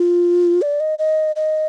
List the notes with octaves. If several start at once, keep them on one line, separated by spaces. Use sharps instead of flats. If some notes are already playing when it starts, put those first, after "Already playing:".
Already playing: F4
D5
D#5
D#5
D#5